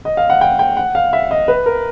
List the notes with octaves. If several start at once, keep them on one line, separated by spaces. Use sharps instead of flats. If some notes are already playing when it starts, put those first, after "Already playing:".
D#5
F5
F#5
G5
G5
F#5
F5
E5
D#5
B4
A#4